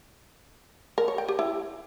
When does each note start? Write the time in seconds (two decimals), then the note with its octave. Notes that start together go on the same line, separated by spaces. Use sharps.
0.98 A#4
1.08 C#5
1.18 G5
1.28 G4
1.39 E4